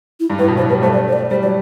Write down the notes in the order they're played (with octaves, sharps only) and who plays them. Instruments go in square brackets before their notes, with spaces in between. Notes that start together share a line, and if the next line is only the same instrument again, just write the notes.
[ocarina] E4
[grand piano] G2
[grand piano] A2 [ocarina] B4
[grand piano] B2
[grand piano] F#3 [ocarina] C5
[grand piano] G3 [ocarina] B4
[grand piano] A3 [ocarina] C5
[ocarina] D5
C5
D5
[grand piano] G3 [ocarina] C5
[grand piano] F#3 [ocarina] D5